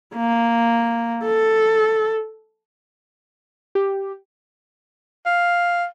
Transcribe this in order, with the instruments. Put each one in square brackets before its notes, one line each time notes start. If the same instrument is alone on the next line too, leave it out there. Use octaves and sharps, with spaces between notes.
[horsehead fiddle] A#3
A4
[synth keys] G4
[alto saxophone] F5